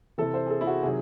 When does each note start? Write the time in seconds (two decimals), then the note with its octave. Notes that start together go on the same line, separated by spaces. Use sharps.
0.18 C3 E3 A4
0.34 C5
0.46 G#4
0.50 A4
0.61 E4
0.67 F#4
0.83 C3 D#3 F#3 G#4